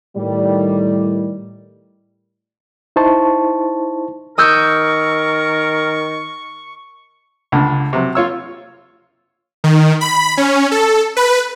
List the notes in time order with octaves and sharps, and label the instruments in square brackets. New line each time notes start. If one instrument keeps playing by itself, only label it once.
[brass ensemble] A2 D#3 G3
[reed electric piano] D#4 E4 C5 A5 C#6
[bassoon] D#3 [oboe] A#4 [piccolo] C#6 [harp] D#6 E6 G6
[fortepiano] C#2 D3 A3
C3 F#3
F4 C#5 E6
[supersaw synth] D#3
B5
C#4
A4
B4